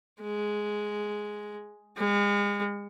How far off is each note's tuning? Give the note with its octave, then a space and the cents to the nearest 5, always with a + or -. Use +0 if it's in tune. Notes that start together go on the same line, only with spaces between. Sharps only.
G#3 +5
G#3 -35